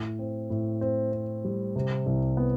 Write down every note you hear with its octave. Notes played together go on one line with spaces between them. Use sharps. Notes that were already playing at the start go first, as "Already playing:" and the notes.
Already playing: A2
C4
A2
C4
C4
G3
C3
C2
B3